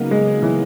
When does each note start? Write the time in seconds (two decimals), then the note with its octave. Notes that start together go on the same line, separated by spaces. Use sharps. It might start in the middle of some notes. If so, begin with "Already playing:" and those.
Already playing: C#3 F#3 A#3 B3 D#4
0.11 G#3
0.42 E3